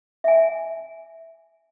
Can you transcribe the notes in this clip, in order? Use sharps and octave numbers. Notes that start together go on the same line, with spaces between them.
E5 G#5